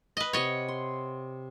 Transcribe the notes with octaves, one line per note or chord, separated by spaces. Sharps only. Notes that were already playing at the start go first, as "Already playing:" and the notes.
B4 D#5
C3 C#5 D#5 F#5
C6